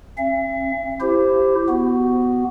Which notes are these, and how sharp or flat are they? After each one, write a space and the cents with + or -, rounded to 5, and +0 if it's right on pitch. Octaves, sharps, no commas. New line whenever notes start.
C4 +45 E5 +45
E4 +20 G4 +0 C5 +0
B3 +5 F#4 +5